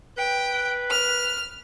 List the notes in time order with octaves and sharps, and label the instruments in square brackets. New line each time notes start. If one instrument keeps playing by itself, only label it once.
[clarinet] B4 [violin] G5
[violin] F6